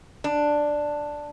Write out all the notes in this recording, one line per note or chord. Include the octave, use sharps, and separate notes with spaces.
D4